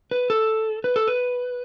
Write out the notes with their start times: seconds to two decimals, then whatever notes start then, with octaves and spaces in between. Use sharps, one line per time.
0.11 B4
0.30 A4
0.84 B4
0.96 A4
1.07 B4